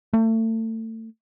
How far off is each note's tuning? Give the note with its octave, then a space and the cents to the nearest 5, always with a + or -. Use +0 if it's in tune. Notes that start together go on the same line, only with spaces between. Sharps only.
A3 +30